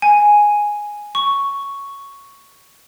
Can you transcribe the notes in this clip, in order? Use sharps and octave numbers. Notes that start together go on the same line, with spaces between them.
G#5
C#6